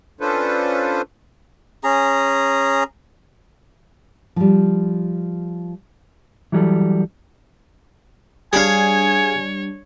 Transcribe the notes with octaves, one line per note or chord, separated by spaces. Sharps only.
C#4 D4 F4 A4 B4 C5
C#4 G#4 A#5
F3 G3
E3 F#3 G3 A4
G3 D4 G#4 C#5 F5 G#5